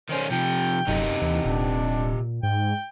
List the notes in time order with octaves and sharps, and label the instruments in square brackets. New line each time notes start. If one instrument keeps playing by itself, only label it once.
[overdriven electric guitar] D#3 C#4 [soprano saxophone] C5
[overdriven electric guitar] C3 F3 [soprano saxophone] G5
[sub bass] D#1 [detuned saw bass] F#2 [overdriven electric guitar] C3 D#4
[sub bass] D#2 [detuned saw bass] E3
[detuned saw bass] D#1 [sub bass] A#2 [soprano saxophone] D4
[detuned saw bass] G#2 [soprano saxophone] G5